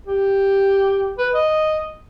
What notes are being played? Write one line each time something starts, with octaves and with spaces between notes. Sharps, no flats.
G4
B4
D#5